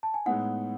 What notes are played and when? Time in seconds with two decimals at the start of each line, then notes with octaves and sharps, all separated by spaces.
0.03 A5
0.14 G#5
0.26 A2 G#3 B3 D#4 F#5